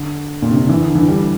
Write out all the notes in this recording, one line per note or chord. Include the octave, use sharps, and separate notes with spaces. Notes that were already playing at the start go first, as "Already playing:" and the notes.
Already playing: D3
A#2
C3
D3
E3
D3
E3
G3